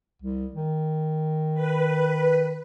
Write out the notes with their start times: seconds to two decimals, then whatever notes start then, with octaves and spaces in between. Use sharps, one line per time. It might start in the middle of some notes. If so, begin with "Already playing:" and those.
0.22 C2
0.55 D#3
1.54 B4